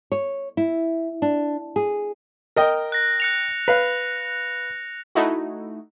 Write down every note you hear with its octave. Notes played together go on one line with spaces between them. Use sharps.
C#5
E4
D4
G#4
A#4 D#5 G5
F#6 A#6
F#6 C#7 F7
B4 F5
A3 D#4 E4 F#4